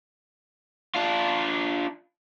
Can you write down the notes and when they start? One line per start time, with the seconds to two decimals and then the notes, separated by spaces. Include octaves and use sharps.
0.95 D4 F4